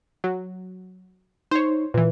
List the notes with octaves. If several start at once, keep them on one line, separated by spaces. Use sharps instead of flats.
F#3
D#4 C5 C#5
A#2 E3 B4